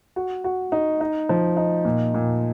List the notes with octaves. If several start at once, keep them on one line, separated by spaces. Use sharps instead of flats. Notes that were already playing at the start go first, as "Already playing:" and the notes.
F#4
F#4
D#4
D#4
F3
D#4
A#2
A#2